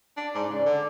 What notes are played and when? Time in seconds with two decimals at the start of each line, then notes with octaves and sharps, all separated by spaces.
0.17 D4
0.35 G#2 D5
0.50 C#3
0.66 D3